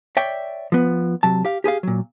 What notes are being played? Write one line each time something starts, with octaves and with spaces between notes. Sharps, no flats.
C#5 D5 E5 G5
F3 B3
C3 F#3 A5
G4 F5
G4 G#4 B4 F5
A#2 F#3